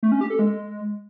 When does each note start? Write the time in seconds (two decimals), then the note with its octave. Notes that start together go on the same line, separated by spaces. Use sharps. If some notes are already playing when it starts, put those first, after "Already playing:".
0.03 A3
0.12 C#4
0.21 G4
0.30 A4
0.39 G#3